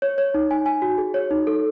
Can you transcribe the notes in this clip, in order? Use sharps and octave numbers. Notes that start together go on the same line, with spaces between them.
C#5
C#5
D#4
G#5
G#5
F#4
G#4
C#5
D#4
A4